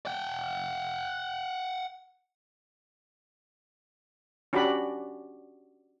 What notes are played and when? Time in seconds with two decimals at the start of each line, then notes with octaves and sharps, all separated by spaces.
0.06 F#5 G5
4.53 C#4 D4 F#4 G4 D5 B5